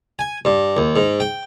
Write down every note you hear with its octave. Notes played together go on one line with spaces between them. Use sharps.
G#5
G2
D#2
G#2
G5